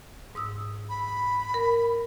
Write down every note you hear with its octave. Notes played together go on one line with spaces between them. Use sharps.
G#2 D#6 E6
B5
A#4